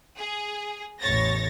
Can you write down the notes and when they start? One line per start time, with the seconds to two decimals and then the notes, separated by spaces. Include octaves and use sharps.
0.18 G#4
1.01 A1 E2 C#5 A6 A#6